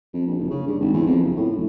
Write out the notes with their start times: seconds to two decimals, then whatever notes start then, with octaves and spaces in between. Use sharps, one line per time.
0.14 F2
0.26 A#1
0.39 F#1
0.50 C#3
0.67 G2
0.80 G#1
0.93 E2
1.06 F2
1.23 F#1
1.36 A2
1.56 E1